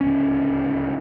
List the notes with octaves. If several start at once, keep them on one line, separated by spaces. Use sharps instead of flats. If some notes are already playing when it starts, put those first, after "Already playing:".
D1 C#2 C#4